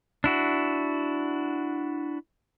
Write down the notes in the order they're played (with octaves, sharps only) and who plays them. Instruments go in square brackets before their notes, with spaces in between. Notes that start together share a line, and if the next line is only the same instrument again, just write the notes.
[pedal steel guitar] D4 E4 F#4